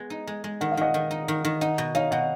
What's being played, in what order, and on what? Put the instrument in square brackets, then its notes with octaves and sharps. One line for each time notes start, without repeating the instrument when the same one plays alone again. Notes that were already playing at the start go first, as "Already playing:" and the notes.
Already playing: [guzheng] G#3 B3
D#4
G#3
G#3
[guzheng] D#3 [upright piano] F#5
[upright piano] F5
[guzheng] D#3 [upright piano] D#5 F#5
[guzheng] D#3
D#4
D#3
D#3
[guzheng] D#4 [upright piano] D#5 F#5
[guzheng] B2
[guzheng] D#4 [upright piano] C#5 F5
[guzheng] B2 [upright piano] D#5 F#5